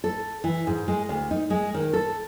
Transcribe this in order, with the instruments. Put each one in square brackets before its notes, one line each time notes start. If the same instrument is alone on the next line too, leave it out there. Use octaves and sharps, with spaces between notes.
[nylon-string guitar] A4
E3
G#2
G#3
D2
D#4
G#3
D#3
A4